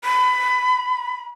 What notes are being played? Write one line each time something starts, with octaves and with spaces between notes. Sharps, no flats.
B5